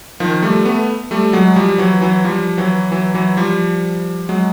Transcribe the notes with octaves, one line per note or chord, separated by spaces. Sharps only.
D#3 F3
G3 A3
A3 B3
G3 A3
F#3 G#3
F3 G3
E3 F#3
E3 F#3
F3 G3
E3 F#3
E3 F#3
E3 F#3
F3 G3
F#3 G#3